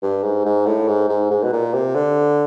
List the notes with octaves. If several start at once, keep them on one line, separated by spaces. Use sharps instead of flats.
G2
G#2
G#2
A2
G#2
G#2
G#2
B2
A#2
C3
D3